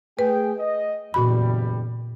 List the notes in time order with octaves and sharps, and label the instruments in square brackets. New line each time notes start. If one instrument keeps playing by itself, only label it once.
[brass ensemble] A3 G#4 G5 [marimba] B4
[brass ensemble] D#5
[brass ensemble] F#1 E2 G3 [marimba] A#2 F#4 B5